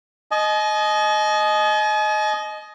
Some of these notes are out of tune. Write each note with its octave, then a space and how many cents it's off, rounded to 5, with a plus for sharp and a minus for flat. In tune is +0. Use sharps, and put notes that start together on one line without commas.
D#5 +0 G#5 +45